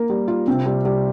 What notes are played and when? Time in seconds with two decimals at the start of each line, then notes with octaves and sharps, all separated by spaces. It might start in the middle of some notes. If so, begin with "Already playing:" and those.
Already playing: A#3 A#4
0.10 G3
0.28 F4
0.48 C3 C4
0.66 G3
0.85 G3